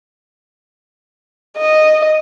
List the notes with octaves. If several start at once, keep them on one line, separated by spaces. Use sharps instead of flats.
D#5